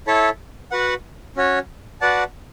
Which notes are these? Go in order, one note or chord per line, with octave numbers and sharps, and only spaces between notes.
E4 A4 C#5 E5 A5
F#4 B4 F#5
C#4 F#4 C#5
F#4 B4 D5 F#5 A5